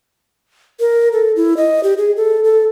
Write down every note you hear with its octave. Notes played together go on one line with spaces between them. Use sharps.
A#4
A4
E4
D#5
G4
G#4
A4
A4